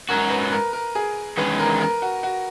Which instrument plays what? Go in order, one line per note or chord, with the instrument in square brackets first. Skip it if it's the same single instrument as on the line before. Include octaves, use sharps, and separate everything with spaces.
[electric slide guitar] G#2 F#3 C#4 F#4 [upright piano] A#4
[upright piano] B4
A#4
A#4
G#4
[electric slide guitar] E2 D#3 G#3 C#4 [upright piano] B4
[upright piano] A#4
A#4
F#4
F#4